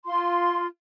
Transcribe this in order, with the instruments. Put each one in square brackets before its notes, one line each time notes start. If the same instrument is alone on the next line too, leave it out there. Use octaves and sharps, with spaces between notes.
[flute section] F4 C6